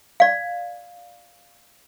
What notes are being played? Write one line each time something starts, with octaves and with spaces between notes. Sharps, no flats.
D5 F5